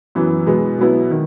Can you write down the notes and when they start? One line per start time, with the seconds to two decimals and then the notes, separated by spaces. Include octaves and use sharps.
0.15 F#2 E3 B3
0.46 B2 G#3 B3
0.78 B2 F#3 B3 E4
1.11 D#3